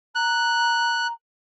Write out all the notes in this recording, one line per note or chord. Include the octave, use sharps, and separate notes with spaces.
A#5 F#6